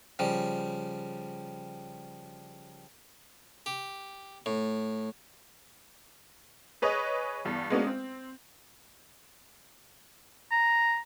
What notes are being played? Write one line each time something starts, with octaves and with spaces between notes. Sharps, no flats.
C#3 F3 G3
G4
A2
G#4 B4 C#5 D#5
E2 G2
G#3 A#3 B3 C#4 D4 F#4
C4
A#5